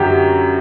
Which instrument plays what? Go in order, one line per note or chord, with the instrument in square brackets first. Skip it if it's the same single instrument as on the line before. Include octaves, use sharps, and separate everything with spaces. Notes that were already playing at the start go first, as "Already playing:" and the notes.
Already playing: [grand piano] F#2 D3 F#4 G4